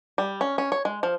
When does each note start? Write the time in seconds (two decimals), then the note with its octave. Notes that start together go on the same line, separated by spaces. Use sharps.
0.18 G3
0.41 C#4
0.58 C#4
0.72 C#5
0.85 G#3
1.03 F3